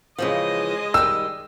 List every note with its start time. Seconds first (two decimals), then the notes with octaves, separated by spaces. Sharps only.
0.18 C#3 E3 F3 G#3 D#5
0.94 D#3 G3 E6